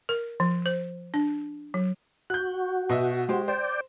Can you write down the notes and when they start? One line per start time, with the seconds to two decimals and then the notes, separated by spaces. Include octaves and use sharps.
0.09 A#4
0.40 F3
0.66 C5
1.14 D4
1.74 F#3
2.30 F#4 F#6 G6
2.89 B2 D#5 E5
3.29 G#3 G4 C5
3.48 C5 D5 G5